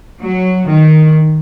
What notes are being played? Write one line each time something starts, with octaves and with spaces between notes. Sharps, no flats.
F#3
D#3